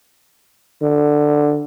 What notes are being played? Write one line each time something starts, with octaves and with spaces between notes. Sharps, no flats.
D3